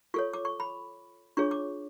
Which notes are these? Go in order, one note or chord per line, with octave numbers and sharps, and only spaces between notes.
F4 A4 C#5 C#6
D6
C#6
B5
D4 F4 G#4 C#5 C#6
D6